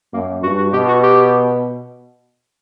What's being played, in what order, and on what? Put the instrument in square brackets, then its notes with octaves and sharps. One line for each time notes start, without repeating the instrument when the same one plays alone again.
[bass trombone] F#2 [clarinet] A#3
[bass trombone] G2 [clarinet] F#4
[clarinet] F#4
[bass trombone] B2 [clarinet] G4
[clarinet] F#4
G4